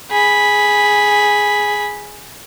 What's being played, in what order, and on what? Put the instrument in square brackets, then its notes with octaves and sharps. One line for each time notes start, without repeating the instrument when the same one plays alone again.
[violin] G#4 B5